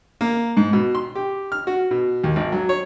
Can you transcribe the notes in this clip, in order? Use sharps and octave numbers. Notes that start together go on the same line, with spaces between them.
A#3
G#2
B2
C6
G4
F6
F#4
B2
D#2
G#1
F#3
C#5